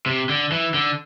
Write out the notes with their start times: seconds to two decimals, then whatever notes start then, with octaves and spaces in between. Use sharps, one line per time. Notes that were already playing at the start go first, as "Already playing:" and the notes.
0.06 C3
0.29 D3
0.52 E3
0.74 D3